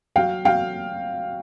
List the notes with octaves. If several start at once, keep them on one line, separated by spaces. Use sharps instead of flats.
F#3 F5 G5
F#3 F5 G5